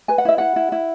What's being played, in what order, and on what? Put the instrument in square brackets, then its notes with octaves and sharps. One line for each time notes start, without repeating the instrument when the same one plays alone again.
[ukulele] B4 G#5
F#5
E4 E5
E4 F#5
E4
E4